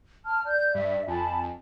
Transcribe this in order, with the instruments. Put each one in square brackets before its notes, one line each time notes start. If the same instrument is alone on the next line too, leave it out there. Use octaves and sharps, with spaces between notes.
[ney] A5 [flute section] F6
[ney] D5 [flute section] G6
[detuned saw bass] G2 [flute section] E5
[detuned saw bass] F2 [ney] G#5 [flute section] A5 B5